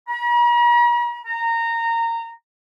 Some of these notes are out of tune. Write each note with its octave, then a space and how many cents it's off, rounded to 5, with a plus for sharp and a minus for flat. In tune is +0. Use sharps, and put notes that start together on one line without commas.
A#5 +45
A#5 -20